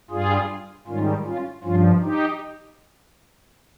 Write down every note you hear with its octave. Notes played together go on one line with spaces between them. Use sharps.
G2 G3 F4 G#4
G#2 D#3 G3 C#4 F4
C#4 F4
G2 F3 C#4 F4
D#4 G4